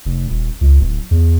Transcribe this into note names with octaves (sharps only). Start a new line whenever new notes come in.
F1
D#1
C#2
D1
E2